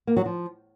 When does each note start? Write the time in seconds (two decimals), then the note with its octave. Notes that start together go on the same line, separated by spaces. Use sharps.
0.07 A#3
0.17 F#3
0.26 F3